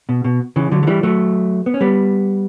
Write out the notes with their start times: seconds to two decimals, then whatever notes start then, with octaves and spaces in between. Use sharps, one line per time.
0.09 B2
0.24 B2
0.56 C#3 E3
0.71 D3 F#3
0.83 F#3
0.87 E3 G3
1.03 F#3 A3
1.66 B3
1.74 C#4
1.81 G3 B3